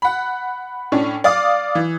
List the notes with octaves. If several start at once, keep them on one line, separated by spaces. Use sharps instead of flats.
F#5 B5
A2 C#4 D4
D5 F5 D6 D#6
E3